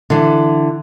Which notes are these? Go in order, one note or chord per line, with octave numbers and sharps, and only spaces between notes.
D3 E3